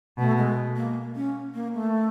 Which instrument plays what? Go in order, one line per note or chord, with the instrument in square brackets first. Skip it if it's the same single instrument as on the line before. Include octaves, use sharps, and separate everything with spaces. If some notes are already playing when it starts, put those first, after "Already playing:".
[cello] B2 [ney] A3
[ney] G#3
A#3
C#4
A#3
A3